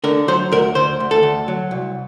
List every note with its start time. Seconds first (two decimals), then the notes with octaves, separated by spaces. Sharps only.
0.04 D3 A#4
0.28 F#3 C5
0.52 D2 A#4
0.75 D2 C5
1.00 D2
1.11 A4
1.23 D2
1.48 F#3
1.71 C2